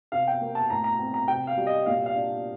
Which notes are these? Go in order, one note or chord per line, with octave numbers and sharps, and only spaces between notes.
C3 F5
G5
A#3
A5
A2 A#5
A#5
C4
A#5
C3 G5
F5
G3
D#5
A#2 F5
F5
D4